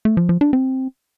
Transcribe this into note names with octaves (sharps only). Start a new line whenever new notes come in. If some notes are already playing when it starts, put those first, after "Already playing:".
A3
F3
F3
D4
C4